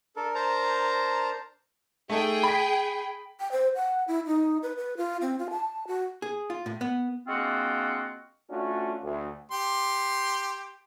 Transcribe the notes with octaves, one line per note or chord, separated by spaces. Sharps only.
D4 A4 A#4
C5 A5 A#5
A3 D#4 G#4 A4 G5
B5 B6
G5
C5
F#5
E4
D#4
B4
B4
F4
C4
F4
A5
F#4
G#4
F4
A2
B3
G#3 A#3 C4 D4 F4 F#4
A3 C#4 D4 F4 F#4
D2
G4 C6